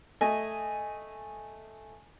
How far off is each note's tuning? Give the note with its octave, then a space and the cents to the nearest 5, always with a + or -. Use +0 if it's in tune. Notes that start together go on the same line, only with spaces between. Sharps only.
A3 +0 D#5 +0 G#5 -5